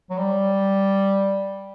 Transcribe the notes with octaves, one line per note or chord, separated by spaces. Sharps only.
F#3
G3